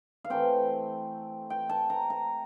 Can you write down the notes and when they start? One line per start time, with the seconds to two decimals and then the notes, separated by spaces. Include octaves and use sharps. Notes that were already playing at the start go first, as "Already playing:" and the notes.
0.24 F5
0.30 E3 A3 C4 G5
1.50 G5
1.69 A5
1.90 A#5
2.10 A#5